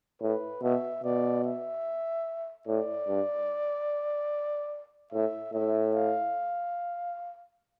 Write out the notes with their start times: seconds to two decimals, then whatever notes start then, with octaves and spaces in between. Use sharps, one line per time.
0.22 A2 B4
0.62 B2 E5
1.04 B2 D5
1.45 E5
2.67 A2 D5
3.08 G2
5.13 A2 E5
5.54 A2 E5
5.95 F5